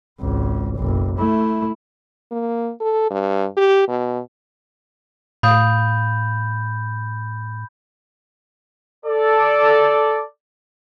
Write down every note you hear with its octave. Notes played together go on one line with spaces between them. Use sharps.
G#1 C#2
F#1 B1
A3 E4
A#3
A4
G2
G4
B2
A2 F5 B5 D#6 G6
A4 D5